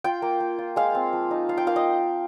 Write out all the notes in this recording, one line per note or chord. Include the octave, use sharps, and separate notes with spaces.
F4 G5
A#3
A#3
F4
G#3 F5
C4
F3
D#4
F4 F5
G5
A#3 F5
D#5